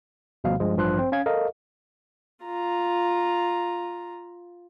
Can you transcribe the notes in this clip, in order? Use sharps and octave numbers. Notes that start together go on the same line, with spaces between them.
D2 B2 F3 G3 F5
G2 F3 G#3
A1 G2 F3 C6 F#6
C4 C5
C#4 F5 G#6
A4 A#4 D#5 F5
F4 A#5